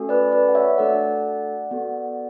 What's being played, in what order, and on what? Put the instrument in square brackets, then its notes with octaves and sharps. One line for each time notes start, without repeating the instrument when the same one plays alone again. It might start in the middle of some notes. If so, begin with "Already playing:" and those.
Already playing: [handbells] A3 C#4 F#4 A4
B4 D5
B4 D5
F#5
C#5 E5
A3 D4 F#4 A4 D5 F#5
B3 F#4 A4